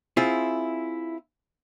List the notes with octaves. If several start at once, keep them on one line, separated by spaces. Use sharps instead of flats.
C4 E4 F4 G#4